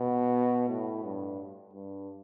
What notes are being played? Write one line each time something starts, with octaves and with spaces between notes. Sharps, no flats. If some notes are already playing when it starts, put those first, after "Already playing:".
Already playing: B2
A2
G2
G2